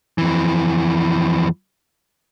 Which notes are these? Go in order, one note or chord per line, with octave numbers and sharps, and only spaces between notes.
F2 E3